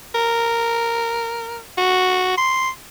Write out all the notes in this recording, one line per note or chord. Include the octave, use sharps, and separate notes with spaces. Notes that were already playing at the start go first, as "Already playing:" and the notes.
A#4
F#4
C6